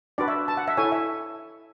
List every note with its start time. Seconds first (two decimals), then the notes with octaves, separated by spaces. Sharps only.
0.18 D4 F#4 B4 D5
0.28 E5
0.48 A5
0.57 F#5
0.68 E5
0.77 E4 A4 C#5 G#5
0.92 E5